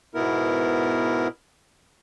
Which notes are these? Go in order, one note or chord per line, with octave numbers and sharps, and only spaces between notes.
G#2 B2 B3 E4 A#4